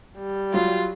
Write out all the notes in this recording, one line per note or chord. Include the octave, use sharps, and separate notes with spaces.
G3
F#3 F4